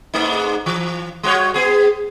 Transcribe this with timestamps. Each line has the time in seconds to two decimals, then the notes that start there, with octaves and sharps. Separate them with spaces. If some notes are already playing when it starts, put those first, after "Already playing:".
0.14 G#2 A3 D#4
0.66 E3
1.23 G3 F#4 C#5
1.54 B3 G#4